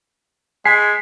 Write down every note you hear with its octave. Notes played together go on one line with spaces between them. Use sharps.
G#3 G#5 B6 C7